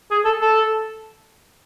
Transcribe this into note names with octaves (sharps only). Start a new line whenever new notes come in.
G#4
A4
A4